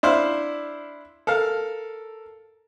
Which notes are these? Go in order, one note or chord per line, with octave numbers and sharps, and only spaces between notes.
D4 E4 C5 F5
A4 A#4 F5